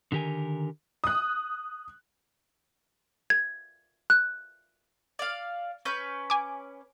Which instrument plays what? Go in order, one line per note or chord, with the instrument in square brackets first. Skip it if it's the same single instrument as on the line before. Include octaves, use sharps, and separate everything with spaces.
[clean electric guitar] D3 D#3 G4 A#4 G#5
[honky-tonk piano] D#6 F#6
[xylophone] G#6
F#6
[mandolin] D5 F5
C#4 B4 G6
[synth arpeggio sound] G#5 D6